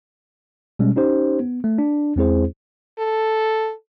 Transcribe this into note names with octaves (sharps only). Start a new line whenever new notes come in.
B2 G3 G#3 C#4
C#4 D#4 G4 C5
B3
A3
D4
E2 G#3 C4 E4 G#4 C5
A4